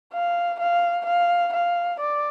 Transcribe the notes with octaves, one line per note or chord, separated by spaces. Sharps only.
F5
F5
F5
F5
D5